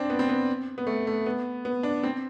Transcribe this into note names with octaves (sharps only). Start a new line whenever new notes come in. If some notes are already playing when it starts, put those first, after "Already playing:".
Already playing: C4 D4
B3
C4
B3
B3
A3
A3
B3
B3
D4
C4